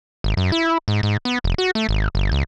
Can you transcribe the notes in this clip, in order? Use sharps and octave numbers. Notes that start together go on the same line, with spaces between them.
G#1
F#2
E4
G#2
G#2
B3
F1
F#4
A3
G#1
G1
C#2